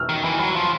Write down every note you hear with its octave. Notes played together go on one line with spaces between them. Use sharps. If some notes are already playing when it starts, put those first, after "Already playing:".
Already playing: E6 F6
D#3
E3
F#3
F3